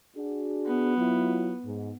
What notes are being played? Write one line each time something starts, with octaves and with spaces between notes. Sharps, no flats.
D4 F#4 G#4
B3
F#3 E4 F4
G#2